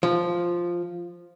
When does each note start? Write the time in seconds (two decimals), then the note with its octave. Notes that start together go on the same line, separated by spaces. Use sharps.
0.03 F3